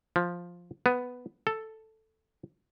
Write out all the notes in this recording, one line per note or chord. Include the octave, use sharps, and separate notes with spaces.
F3
B3
A4